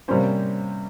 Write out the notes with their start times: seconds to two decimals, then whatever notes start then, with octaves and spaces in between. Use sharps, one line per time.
0.08 C3 G3 A#3 C#4 C5